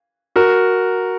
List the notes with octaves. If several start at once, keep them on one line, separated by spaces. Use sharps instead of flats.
F#4 A#4